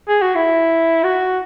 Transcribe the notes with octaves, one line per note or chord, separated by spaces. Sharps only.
G#4
F#4
E4
F#4